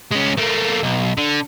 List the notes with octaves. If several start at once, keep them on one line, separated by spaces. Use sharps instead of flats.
G#3 C#4
A3 A#3
B1
D3